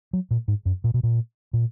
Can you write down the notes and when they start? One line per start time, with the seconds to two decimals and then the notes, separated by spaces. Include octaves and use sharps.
0.13 F#3
0.31 A#2
0.48 G#2
0.66 F#2
0.84 A#2
0.94 B2
1.03 A#2
1.53 A#2